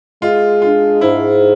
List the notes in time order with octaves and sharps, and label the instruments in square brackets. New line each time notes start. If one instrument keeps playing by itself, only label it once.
[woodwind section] G#3 [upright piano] F4
[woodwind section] D4 [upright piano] F4
[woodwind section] G#2 [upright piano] E4